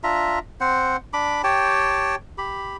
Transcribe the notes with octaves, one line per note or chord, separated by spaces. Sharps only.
D4 F4 E5 A#5
C4 C5 F#5
D4 B5 D6
G4 C#5 G5 A5
G4 B5